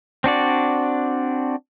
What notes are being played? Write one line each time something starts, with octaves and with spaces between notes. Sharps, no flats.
C4 D4 F#4 D5